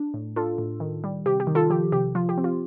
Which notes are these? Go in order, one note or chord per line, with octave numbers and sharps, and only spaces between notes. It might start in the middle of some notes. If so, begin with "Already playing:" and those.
Already playing: D4
A2
D4 F4 A4
A2
D#3
G3
C3 G4
G4
D#3
F4 A4
F3 G4
C3 G4
F3 F4
G4
C4
F4